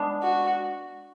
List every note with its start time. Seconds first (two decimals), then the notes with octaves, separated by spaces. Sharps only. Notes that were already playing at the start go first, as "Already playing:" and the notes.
Already playing: G#3 B3 D4
0.22 F#4